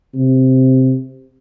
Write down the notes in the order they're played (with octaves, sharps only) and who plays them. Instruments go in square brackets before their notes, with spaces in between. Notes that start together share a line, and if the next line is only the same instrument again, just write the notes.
[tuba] C3